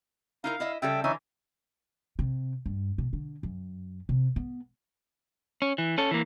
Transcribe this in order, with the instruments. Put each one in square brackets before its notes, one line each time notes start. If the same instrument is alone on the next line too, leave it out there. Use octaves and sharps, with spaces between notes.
[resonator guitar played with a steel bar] D#4 E4 A#4 [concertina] F5
[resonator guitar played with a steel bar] E4 D#5 E5
[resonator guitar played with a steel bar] C#3 G3 A4 [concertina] E5 G5
[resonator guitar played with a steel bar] D3 E3 G#5 [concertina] C#4 D#4 E5
[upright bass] C3
G2
B2
D3
F#2
C3
B3
[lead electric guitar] C#4
E3
C#4 A4
E3 A#3